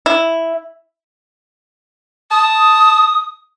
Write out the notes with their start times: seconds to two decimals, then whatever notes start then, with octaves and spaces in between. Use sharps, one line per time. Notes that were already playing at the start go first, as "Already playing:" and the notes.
0.06 E4
2.31 A5 D#6